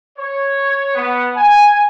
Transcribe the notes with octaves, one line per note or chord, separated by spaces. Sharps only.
C#5
B3
G#5